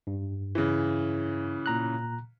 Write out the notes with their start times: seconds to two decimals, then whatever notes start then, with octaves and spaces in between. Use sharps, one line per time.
0.07 G2
0.55 C#3 E3
1.66 A#2 A#5 F#6